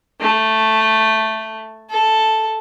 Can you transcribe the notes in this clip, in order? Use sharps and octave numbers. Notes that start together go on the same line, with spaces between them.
A3
A4